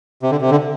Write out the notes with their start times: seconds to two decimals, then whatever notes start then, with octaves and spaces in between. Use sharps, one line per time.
0.23 C3
0.31 D3
0.42 C3
0.50 D3